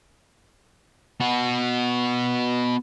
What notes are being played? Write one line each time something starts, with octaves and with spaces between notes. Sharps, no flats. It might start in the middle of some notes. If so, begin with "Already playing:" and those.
B3 F#4